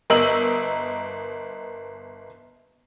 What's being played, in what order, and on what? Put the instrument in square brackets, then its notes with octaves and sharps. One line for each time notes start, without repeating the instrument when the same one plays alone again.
[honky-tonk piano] G1 A#4 D#5 E6 F#7